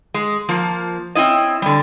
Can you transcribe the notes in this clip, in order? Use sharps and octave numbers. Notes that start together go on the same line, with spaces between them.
G#3
F3 A#3
C4 C#4 E4 D#5
D3 G3